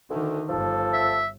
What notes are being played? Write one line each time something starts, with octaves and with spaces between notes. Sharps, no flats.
D2 D3 D#3
G1 F3 A4
E5